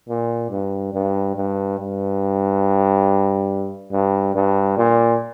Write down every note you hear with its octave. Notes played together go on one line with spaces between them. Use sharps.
A#2
G2
G2
G2
G2
G2
G2
A#2